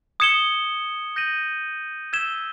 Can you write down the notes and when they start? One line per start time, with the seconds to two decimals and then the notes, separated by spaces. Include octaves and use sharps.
0.20 D#6 G#6 C#7 E7 G7
1.16 G6 A#6 D#7 F#7
2.13 E6 G#6 B6 E7 G7